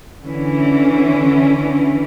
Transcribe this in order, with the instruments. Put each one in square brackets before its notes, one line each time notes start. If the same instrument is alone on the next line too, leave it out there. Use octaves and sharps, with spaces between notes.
[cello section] D3 E3 C#4